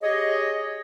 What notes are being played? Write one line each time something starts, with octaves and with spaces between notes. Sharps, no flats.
G4 G#4 C#5 D#5